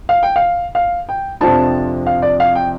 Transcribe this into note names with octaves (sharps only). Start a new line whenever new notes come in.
F5
G5
F5
F5
G5
F2 C3 F3 D4 A5
F5
D5
F5
G5